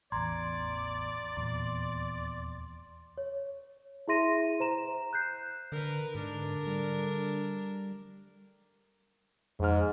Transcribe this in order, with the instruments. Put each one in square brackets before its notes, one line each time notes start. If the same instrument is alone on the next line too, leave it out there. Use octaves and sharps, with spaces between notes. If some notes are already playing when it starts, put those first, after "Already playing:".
[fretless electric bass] A1 E2 [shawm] D5 [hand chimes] A#5 C6 G#6
[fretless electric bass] D#1 E2 A#2 [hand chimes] C6
[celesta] C#5
E4 G#4 E5 C6 A#6 D#7
C5 A#5 E7
F#6 G6 C7
[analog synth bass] D3 [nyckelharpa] A#4 B4
[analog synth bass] G#2 [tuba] D3 [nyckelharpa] D4 A#4
[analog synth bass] G3
[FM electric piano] F2 F6 [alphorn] G#2